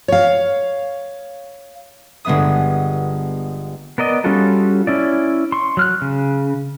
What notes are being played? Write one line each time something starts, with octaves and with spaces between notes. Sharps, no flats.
C#5 F5
G1 G#3 B3 E5 D#6
B3 A#4 D5 D#5
G3 C#4 F4 F#4 A4
C#4 E4 D5
C6 C#6
F#3 F6 F#6
C#3